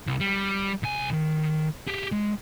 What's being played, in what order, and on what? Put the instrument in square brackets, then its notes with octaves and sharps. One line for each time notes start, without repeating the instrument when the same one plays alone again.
[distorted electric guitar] C2
G3
C2 G#5
D#3
G4 G#4
G#3